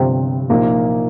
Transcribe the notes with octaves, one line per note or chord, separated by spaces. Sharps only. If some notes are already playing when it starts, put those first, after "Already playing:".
Already playing: G1 G2 C3 F3 C4
A#1 A#2 A#3 D#4